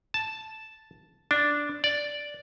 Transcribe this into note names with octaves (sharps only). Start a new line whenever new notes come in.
A5
D4
D5